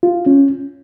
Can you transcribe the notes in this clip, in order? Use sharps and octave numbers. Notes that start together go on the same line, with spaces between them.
F4
C#4